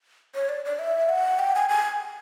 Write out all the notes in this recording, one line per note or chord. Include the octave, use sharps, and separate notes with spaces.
C#5
D5
D5
E5
F#5
G5
G#5
G#5